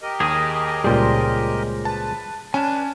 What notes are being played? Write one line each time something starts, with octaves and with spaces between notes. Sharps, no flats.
G4 A#4 D#5
D#2 G#4 D#6
C#2 A#2 G3 G#4 C5
B4 A5
C#4 D4 B4 G#5 A5